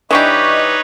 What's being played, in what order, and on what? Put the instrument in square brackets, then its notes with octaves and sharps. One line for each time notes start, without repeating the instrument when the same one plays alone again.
[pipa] E3 D4 G4 [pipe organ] D#4 B4 C#5 [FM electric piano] D#5 C#6